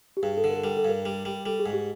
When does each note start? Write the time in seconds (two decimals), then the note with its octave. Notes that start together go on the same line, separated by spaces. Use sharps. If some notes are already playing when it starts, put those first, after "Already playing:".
0.17 G4
0.23 G2 G#4
0.37 A4
0.44 D3
0.50 A#4
0.64 G3 A#4
0.77 A4
0.85 G2 A#4
1.05 G3
1.25 G3
1.46 G3 A4
1.59 G#4
1.66 G#2
1.73 G4